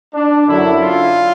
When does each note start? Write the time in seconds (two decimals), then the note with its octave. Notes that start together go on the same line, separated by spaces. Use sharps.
0.14 D4
0.47 F#2 D3 F#3 E4
0.81 F4